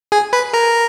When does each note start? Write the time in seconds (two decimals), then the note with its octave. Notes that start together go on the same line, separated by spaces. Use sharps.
0.12 G#4 G#5
0.33 B4 B5
0.53 A#4 A#5